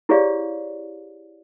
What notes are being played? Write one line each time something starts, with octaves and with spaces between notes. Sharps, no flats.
E4 G4 G#4 C#5 D5 F5